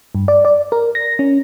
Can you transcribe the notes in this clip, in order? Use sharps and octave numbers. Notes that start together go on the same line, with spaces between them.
G2
D5
D5
A#4
A#6
C#4